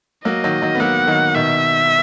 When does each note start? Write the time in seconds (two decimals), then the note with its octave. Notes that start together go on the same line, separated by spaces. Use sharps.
0.25 F#3 A#3 D#5
0.44 D#3 F#3
0.62 D#3 F#3
0.75 B3
0.80 F#3 A#3 F#5
1.07 D#3 F#3
1.35 B2 D#3 E5